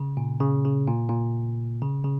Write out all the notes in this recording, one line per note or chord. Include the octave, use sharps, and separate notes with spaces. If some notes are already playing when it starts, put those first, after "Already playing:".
Already playing: C#3
A#2
C#3
C#3
A#2
A#2
C#3
C#3